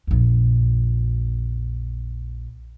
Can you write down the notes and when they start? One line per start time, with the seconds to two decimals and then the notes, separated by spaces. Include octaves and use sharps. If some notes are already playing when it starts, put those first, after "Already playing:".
0.07 A#1 F2